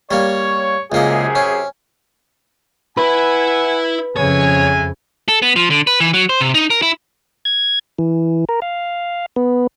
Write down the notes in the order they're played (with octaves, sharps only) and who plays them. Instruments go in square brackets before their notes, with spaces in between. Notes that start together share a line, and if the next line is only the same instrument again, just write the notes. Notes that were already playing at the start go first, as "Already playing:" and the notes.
[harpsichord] G3 A#3 [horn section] C#5
[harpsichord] C#2 A#3 D#5 [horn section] F#2 C3 G#4
[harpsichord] C#4
[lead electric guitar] E4 E5 [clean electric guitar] B4 [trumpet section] F#5 G#5
[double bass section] F2 C#3 [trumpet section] G#3 E4 G#5 [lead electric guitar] C#5
[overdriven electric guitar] A4
B3
F3
D3
B4
E3
F#3
C5
C3
D#4
A#4
E4
[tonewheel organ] G#6
E3
A#4
F5
B3